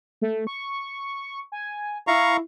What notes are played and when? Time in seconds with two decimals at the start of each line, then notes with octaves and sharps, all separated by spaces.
0.21 A3
0.47 C#6
1.52 G#5
2.07 E4 F5 A#5 C#6